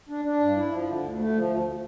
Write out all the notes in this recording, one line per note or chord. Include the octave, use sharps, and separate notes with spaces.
D4
D4
G2
E4
F3
D3
D2
A3
F3
D2